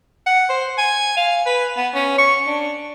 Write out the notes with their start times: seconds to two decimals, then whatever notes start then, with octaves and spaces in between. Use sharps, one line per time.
0.26 F#5
0.49 C5
0.78 G#5
1.17 F5
1.46 B4
1.77 B3
1.94 C#4
2.18 C#6
2.47 D4